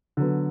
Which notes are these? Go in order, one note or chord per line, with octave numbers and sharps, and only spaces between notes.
D3 F#3 B3